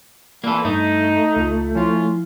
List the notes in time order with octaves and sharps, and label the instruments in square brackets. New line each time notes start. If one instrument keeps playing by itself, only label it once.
[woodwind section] A#2 E3 [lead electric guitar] A#3 A4
[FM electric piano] G2 [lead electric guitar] A3 [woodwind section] D#4
[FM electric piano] C#2 F4
[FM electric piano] F3 E4 [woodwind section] C#4 F4